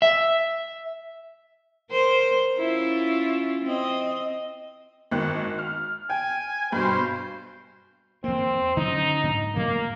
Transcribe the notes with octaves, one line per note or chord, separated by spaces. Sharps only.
E5
A#4 C5
C#4 E4 F4
C4 D#5
G#1 D#3 F#6
F6
G5 G#5
G2 B2 C5
E2 A#3 C4
D3 F#3 C#4 D#4
G#2
A2 F#3 A#3